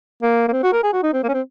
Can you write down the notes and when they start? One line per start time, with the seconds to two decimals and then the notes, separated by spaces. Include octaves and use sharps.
0.22 A#3
0.48 A#3
0.53 C4
0.63 F#4
0.73 A#4
0.83 G#4
0.93 F#4
1.03 D#4
1.13 C4
1.23 A#3
1.29 C#4
1.34 C4